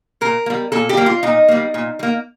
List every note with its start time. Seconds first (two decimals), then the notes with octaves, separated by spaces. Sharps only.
0.21 A#2 A#4
0.46 A#3
0.50 G3
0.72 A#2 A4
0.89 G4
0.97 G3 A#3
1.06 F4
1.23 A#2 D#4
1.48 G3 A#3
1.74 A#2
1.99 G3
2.03 A#3